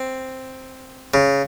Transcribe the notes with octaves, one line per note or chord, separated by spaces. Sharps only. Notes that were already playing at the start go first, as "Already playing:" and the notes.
Already playing: C4
C#3